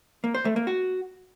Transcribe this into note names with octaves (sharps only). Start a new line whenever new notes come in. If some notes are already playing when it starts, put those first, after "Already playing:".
A#3
C5
A3
A#3
F#4